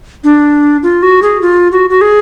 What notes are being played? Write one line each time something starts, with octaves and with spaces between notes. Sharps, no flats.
D4
F4
F#4
G#4
F4
F#4
F#4
G#4